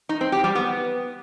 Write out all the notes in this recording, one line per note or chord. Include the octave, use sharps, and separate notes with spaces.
D#4
C4
G4
G3
B3